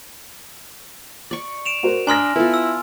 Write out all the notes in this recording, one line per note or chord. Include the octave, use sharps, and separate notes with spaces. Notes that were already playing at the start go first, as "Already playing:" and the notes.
D5 C#6
D7 E7 F7
F#4 A#4 C5
D4 G#5 A#5 C6 D#6 F6 A#6
B3 E4 F4 A4
E6